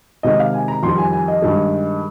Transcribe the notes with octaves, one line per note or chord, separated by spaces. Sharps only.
C3 D#3 G#3 D#5
F5
G#5
A#5
F2 D#3 G3 C6
G#5
G#5
D#5
G2 D#3 G#3